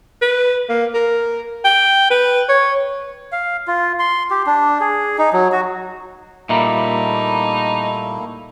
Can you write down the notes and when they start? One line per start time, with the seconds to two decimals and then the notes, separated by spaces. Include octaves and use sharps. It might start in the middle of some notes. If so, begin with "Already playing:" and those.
0.21 B4
0.69 A#3
0.94 A#4
1.64 G5
2.10 B4
2.48 C#5
3.32 F5
3.68 F4
3.99 C6
4.31 G4
4.47 D4
4.80 G#4
5.18 D#4
5.33 F#3
5.52 F#4
6.49 A#2 G3 A3 A#3 D#4 E4 E5 A#5